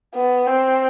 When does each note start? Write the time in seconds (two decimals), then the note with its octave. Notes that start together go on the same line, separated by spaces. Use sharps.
0.14 B3
0.47 C4